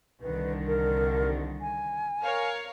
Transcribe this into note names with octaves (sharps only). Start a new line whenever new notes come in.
C2 D3 D#3 B4
A#4
G#5
A#4 C#5 F5